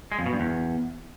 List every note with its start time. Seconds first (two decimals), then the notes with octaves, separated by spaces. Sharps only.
0.12 G#3
0.19 F2
0.26 B2
0.33 G2
0.40 E2